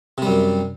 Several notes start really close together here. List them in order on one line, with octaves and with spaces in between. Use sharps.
C3 G3 F#2